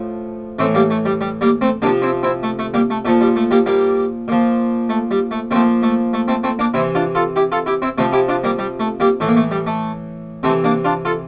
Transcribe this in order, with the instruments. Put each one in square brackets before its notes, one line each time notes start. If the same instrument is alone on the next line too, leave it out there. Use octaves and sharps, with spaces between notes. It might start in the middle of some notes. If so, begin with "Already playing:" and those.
Already playing: [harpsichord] A2 F3
A2 E3 A3 C4
G3 A#3
A3
G3
G3
G3 A#3
A3 C4
C3 A#3 D4
F3
C4 E4
C4 E4
A3
A3
G3 A#3
A3
A#2 F3 A3
G3
A3
G3 A#3
G3 A#3
A#2 F3
A3
G3
A3
A#2 F3 A3 C4
A3
A3
A3 C4
A3 C4
A#3 D4
C3 E3 C4 E4
D4 F4
F4 A4
E4 G4
F4 A4
E4 G4
C4 E4
C3 F3 A3 C4
E4 G4
D4 F4
G3 A#3
G3
A3
G3 A#3
A2 E3 A3
A#3
A3
G3
A3
C3 E3 A3 C4
A#3 D4
D4 F4
F4 A4